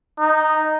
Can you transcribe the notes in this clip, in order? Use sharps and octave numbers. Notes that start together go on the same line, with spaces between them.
D#4